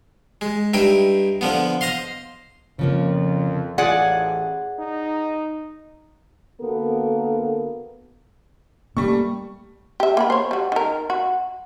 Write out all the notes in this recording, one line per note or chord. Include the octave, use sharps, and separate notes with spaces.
G#3
G2 D#4 E4 G5
D3 F3 B3
C5 D#5 F5 C6
F2 C#3 F3 A#3
A1 F4 G#4 D5 F#5
D#4
D3 A#3 B3 F#4 A4 A#4
G3 A3 A#3 C#6
G4 E5
A#3 B3 B5
C5 C#5
G3 F#4
D#3 A#4
F#4